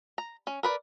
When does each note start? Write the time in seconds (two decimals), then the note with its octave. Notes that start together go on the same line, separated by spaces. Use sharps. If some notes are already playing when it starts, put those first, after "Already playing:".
0.18 A#5
0.47 C#4
0.63 A#4 B4 D5